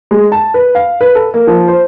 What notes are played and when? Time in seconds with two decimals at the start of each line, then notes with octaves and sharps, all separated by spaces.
0.11 G#3
0.32 A5
0.54 B4
0.75 F5
1.01 B4
1.15 A4
1.34 A#3
1.47 F3
1.68 C5